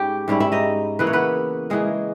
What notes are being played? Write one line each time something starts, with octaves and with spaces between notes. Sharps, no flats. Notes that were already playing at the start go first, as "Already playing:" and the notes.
Already playing: G#2 G3 C#4 G4 G5
G#2 G3 C#4 E4
E4 E5
D#4 D#5
C#3 E3 A#3 E4 B4
C#5
B3 B4
C#3 E3 G#3 A#3 G#4